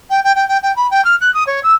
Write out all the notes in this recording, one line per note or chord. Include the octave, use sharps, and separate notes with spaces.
G5
G5
G5
G5
G5
B5
G5
F6
F#6
D#6
C#5
E6